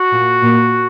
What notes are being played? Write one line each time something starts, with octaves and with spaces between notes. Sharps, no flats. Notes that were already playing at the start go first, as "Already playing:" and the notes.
Already playing: F#4
A#2
A#2